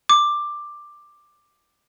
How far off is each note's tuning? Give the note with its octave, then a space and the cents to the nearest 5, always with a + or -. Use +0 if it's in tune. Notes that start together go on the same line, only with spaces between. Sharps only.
D6 +10